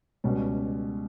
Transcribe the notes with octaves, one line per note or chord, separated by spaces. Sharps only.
C#2 B2 G3 C#4